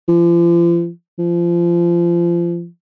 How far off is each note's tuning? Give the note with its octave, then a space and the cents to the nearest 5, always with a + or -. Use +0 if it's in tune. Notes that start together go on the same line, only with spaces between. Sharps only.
F3 -40
F3 -25